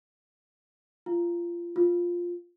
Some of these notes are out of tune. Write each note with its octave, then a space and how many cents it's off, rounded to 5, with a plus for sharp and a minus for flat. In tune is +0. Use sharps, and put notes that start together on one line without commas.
F4 -20
F4 +5